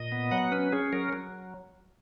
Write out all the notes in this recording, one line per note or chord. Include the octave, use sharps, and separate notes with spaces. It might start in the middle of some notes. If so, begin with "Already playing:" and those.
Already playing: A#2 D#5
B3
F#3 F#5
C#4 B4
C#4 G#4
F#3 A#4
F#3